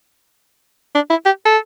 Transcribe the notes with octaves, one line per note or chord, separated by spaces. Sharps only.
D4
E4
G4
A4